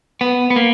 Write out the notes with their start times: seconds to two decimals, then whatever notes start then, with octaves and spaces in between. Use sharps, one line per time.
0.21 B3
0.50 B3
0.56 A#3